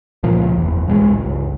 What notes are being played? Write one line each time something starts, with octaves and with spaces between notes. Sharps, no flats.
C#2 A#2 F3 A#3
F#1 E2
C#2 A2 G3 G#3
G1 C#2